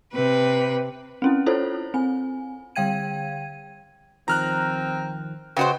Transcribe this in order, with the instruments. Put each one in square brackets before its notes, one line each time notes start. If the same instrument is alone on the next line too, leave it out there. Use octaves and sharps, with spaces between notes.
[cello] C3 B4
[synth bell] C4 C#4 E4
E4 F4 A4 C5 C#5
C4 G#5
D3 G3 F5 G5 G#6 D#7
[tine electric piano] C2 D#3 F3 [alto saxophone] C4 [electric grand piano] A#5 F6 F#6
[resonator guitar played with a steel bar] C#3 F#4 C5 [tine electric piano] B4 D#5 [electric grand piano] G5